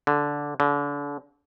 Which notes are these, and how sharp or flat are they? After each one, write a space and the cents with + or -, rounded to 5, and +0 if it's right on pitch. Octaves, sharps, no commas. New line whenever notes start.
D3 -10
D3 -35